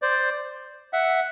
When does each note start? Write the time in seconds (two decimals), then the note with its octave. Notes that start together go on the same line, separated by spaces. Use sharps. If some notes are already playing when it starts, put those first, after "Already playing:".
0.02 C5 D5
0.93 E5 F#5